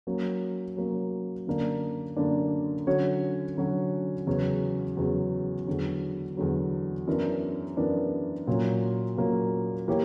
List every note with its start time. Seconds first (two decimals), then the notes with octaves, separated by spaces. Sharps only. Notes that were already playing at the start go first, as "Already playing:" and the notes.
0.07 F#3 A#3 C#4
0.77 F#3 A#3 C#4
1.47 F#2 D3 A#3 D4
2.17 F#2 D3 A#3 D4
2.87 D3 F#3 C#4 F#4 C#5
3.57 D3 F#3 C#4 F#4 C#5
4.27 E2 C#3 F#3 C#4
4.97 E2 C#3 F#3 C#4
5.67 E2 D3 F#3
6.37 E2 D3 F#3
7.07 F#2 E3 B3 D4 A#4
7.77 F#2 E3 B3 D4 A#4
8.47 A#2 F#3 A#3 C#4
9.17 A#2 F#3 A#3 C#4
9.88 E3 A#3 E4 G4 C#5